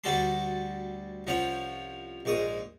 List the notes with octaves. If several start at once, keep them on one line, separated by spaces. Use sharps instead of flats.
D2 G3 F#4 A4 A5 C6
C2 F3 C#4 C#5 F#5
A#1 G#2 C#6 D#6